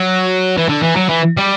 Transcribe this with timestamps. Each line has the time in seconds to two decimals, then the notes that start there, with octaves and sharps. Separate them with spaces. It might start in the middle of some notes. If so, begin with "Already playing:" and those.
Already playing: F#3
0.58 E3
0.69 D3
0.83 E3
0.97 F#3
1.09 E3
1.37 G3